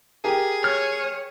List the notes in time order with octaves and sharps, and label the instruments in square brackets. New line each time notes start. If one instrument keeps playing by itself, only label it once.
[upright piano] G4 A#4 [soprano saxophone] G#4
[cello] C#5 [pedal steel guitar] F6